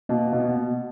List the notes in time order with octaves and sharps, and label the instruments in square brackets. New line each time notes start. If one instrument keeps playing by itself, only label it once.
[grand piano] B2 [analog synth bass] A#3
[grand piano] B2
[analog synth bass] B3